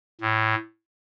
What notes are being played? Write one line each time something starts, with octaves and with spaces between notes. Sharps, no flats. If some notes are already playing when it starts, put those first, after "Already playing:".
A2